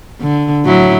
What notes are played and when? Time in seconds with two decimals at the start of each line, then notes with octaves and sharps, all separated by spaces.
0.21 D3
0.65 A2 F#3 E4